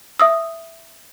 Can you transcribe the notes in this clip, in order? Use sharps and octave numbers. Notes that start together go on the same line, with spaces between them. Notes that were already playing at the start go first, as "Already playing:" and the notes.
E5 D#6 E6